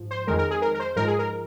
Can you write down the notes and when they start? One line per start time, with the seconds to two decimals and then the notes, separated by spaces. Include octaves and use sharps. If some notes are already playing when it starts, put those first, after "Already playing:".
Already playing: G#2 F3
0.11 C5
0.27 F2 D#3 G#3 A#4
0.39 A#4
0.51 G#4
0.62 A#4
0.74 A#4
0.80 C5
0.96 G#2 F3 G#3 A#4
1.08 G#4
1.19 A#4